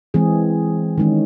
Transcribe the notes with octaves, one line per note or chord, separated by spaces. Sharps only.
E3 G#3 C4 G#4
D#3 G#3 C#4